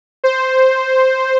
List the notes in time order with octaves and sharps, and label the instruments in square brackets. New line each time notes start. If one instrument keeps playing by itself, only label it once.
[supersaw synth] C5